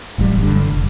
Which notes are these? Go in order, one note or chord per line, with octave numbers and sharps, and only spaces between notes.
E1 A1 F#3 G3
G2 D3
F1